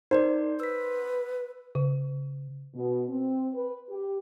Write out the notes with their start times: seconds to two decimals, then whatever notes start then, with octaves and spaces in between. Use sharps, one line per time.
0.11 D#4 A#4 C5 D5
0.60 B4 E6 B6
1.75 C#3
2.75 B2
3.09 C4
3.53 B4
3.89 G4